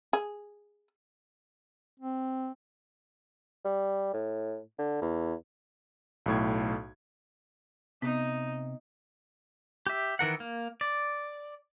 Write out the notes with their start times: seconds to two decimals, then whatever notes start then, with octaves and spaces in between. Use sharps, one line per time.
0.13 G#4
2.00 C4
3.65 G3
4.14 A2
4.79 D3
5.02 E2
6.26 B1 A2 G#6
8.02 C3 B3 D#4
9.87 G4 E5
10.19 D#3 E3 A#4 F#5
10.40 A#3
10.81 D5